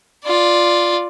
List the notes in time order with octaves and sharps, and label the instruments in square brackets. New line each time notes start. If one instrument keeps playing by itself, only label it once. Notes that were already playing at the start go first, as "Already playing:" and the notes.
[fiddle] F4 D5